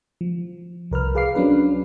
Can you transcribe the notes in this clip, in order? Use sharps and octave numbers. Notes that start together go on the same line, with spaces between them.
F3
C2 A#4 B4 F6
G#4 B4 F5 D6 C7
F#3 C#4 D4 B4